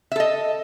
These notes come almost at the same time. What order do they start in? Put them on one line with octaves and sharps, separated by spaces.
E5 A4 D#5